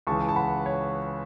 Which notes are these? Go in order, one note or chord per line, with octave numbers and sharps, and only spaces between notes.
C#2 C#3 E3 A5 C#6
A5
F#5 B5
C#5